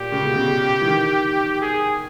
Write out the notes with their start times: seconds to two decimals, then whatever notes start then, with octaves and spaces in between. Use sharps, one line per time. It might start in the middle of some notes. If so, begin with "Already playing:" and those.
Already playing: A#2 G4
0.12 C#3
0.24 B2
0.36 C#3
0.81 E3
0.87 D#3
1.61 G#4